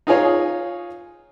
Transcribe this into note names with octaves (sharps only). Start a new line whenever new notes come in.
D#4 F4 G#4 C#5 G#5